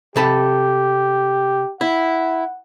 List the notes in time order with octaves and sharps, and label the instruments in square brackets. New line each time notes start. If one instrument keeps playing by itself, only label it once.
[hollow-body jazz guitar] C3 A4 B5 [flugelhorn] G4
[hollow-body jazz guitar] E4 [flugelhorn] F#5